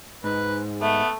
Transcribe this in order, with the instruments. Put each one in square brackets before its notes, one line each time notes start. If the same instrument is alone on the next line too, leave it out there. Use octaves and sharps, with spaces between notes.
[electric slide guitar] G#2 [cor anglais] B4
[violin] A3 [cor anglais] B3 [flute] E5